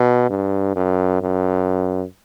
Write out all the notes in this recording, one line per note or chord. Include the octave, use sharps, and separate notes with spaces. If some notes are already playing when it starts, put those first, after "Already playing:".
Already playing: B2
G2
F#2
F#2